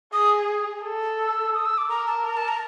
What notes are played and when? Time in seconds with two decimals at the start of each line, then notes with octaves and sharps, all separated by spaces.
0.13 G#4 D#6
0.84 A4
1.19 E6
1.54 D#6
1.66 E6
1.78 D6
1.90 A#4 A#5
2.07 A5
2.24 A#5
2.37 A5
2.48 A#5